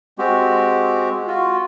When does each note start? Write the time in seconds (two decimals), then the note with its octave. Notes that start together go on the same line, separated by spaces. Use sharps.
0.19 G#3 C4 F#4 G4
1.27 F4 F#4